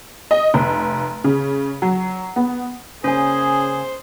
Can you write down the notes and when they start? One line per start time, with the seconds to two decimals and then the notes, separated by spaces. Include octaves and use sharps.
0.31 D#5
0.54 F1
1.24 C#3
1.82 F#3
2.36 B3
3.04 C#3 A#3 C#4 G#4 C5 G#5